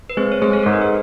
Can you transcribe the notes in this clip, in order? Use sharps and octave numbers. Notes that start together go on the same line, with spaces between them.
B4
G#3 C4 C5
C#5
G#3 C4 C5
A4
G#2 A#4
B4
C5